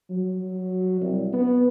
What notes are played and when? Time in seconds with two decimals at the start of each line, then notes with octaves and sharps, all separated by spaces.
0.10 F#3
1.01 C2
1.33 B3